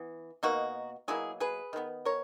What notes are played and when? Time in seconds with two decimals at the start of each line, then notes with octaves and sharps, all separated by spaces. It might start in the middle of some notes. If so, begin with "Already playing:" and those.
Already playing: E3 B3
0.43 B2 A#3 D#4 F#4
1.08 B2 F#3 A#3 E4 G#4
1.40 G#4 B4
1.73 D#3 G#3 B3
2.05 A#4 C#5